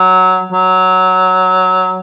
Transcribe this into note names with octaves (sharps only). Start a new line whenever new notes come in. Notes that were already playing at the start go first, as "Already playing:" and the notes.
Already playing: F#3
F#3